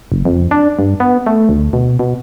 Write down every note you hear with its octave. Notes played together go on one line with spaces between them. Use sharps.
F#1
F2
D4
G2
B3
A3
D2
B2
B2